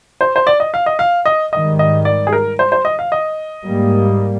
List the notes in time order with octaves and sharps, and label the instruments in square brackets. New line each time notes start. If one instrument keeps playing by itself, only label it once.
[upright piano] C5
C5
D5
D#5
F5
D#5
F5
D#5
[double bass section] G#2 D#3 G3 [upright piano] D#5
[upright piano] D#5
D5
G#4
A#4
C5
C5
D#5
F5
D#5
[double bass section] G#2 G3 A#3